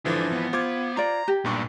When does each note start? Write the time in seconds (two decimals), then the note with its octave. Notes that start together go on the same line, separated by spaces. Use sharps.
0.05 G#1 E3 F3 D4 A4
0.32 B3
0.53 F4 C5 D6 G#6
0.97 F4 D5 A#5
1.28 G4
1.45 B1 G2 A#2 C#6